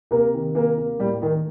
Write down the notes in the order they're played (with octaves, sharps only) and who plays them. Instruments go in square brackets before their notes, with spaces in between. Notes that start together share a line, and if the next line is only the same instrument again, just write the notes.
[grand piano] C3 A#3 A#4
D#3
C3 A#3 A#4
A#3
A2 G3 G4
D#3 A3 D#4